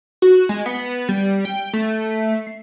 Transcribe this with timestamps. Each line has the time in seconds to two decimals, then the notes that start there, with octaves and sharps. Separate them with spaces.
0.22 F#4
0.49 G#3
0.66 B3
1.08 G3
1.45 G5
1.73 A3
2.47 C7